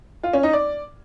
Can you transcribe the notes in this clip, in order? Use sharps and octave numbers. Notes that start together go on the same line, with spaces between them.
F4
C#4
D#4
D5